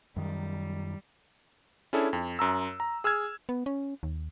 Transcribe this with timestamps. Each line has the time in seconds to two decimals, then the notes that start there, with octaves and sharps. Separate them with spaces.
0.16 F#2 D#3 G3
1.93 C#4 D4 E4 G#4 A4
2.13 F2
2.39 F#2 A#5 E6
2.80 A#5
3.04 G#4 E6 F6 G#6
3.49 B3
3.66 C#4
4.03 D#2